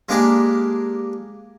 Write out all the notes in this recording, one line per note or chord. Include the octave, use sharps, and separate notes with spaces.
G#3 A#3 D4 G4 G#4 A#4